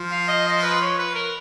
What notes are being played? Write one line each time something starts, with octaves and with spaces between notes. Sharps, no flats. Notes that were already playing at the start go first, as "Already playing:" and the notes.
Already playing: F3
F5
D#5
D#5
B4
C#5
B4
A#4